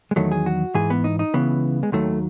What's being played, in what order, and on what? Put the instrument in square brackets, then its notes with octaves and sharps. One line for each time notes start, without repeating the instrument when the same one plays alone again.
[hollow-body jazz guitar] G#3
E2 D#3 F#3 A3
G#4
F#4
G#2 E3 G#4
B3
D#4
D#4
C#2 C#3 E3 B3
G#3
D#2 D#3 F#3 A3